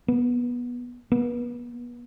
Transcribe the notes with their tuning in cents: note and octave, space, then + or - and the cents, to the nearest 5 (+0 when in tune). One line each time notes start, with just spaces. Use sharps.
B3 -20
B3 -35